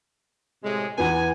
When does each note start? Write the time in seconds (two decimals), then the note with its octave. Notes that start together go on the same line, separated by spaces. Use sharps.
0.64 A2 C3 G#3
0.98 E2 B3 G#5